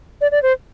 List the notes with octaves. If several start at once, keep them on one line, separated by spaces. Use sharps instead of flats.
D5
D5
C5